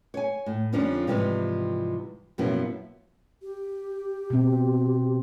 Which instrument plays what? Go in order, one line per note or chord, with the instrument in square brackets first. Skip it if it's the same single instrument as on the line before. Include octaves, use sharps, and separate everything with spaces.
[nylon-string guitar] C#5 G#5
A2
F2 D3 F3 G3 C#4 D4
G#2 C3 E3 F3 G3
F#2 B2 F3 A#3 B3 E4
[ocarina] G4
[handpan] B2 C4